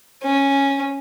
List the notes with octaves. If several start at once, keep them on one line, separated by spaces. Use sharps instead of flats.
C#4